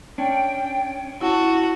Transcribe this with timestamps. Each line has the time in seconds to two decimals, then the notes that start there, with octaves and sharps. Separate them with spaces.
0.18 C#4 D4 G5
1.21 E4 F#4 A5